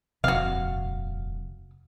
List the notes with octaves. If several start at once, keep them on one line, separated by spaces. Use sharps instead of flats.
D#1 F2 C3 F#4 F5